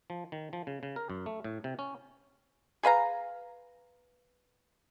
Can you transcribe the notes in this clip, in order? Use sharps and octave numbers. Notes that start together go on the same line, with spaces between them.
F3
D#3
F3
C#3
C#3
A#4
F#2
A3
A2
C3
C#4
G#4 B4 F5 A#5